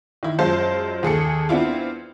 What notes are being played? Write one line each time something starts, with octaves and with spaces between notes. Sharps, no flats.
D#3 E4
F#2 G#3 F4 C5 A5 C7
D#2 G#4 A4 C#7
B3 C4 D4 E4 F4